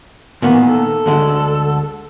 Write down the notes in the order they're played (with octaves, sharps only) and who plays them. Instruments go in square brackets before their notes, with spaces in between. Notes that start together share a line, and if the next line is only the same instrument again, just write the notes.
[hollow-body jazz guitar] A#2 D#3 B3 [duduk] E3
[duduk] A4
[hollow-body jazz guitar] D2 D3 G#3